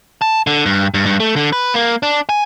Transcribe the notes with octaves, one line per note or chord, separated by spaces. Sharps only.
A5
D3
G2
G2
G2
A3
D3
B4
A#3
D4
G#5